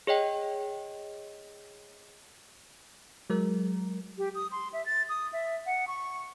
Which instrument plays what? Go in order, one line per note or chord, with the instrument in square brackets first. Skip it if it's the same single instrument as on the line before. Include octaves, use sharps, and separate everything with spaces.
[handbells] G#4 C#5 D#5 G5
[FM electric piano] F#3 G#3 A#4
[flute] G4
D#6
C6
E5
A6
D#6
E5
F#5
C#6